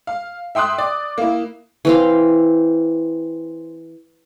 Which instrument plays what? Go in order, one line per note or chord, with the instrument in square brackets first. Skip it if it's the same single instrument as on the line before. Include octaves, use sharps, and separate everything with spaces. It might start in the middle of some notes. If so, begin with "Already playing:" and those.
[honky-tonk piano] F5
E5 G5 C6 D#6 F#6
D5
A#3 E4
[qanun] E3 C4 F5